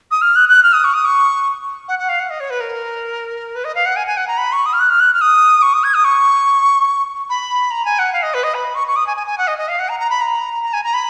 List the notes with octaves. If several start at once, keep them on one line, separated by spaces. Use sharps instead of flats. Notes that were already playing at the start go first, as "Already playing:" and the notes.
D#6
F6
F#6
F#6
F6
D#6
C#6
D#6
C#6
F#5
F#5
F5
F#5
D#5
C#5
B4
A#4
B4
D#5
F5
F#5
G#5
G#5
F#5
A#5
B5
C#6
D#6
F6
F#6
F6
F#6
F6
D#6
C#6
D#6
G#6
D#6
C#6
B5
A#5
G#5
F#5
F5
D#5
B4
D#5
B5
C#6
C#6
D#6
G#5
G#5
G#5
F#5
D#5
D#5
F5
F#5
A#5
A#5
B5
A#5
A#5
G#5
A#5
B5